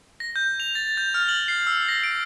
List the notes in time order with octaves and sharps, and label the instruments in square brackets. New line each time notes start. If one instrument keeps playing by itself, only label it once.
[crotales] A#6
G6
F7
A6
G6
F6
F#7
C7
E6
A#6
D7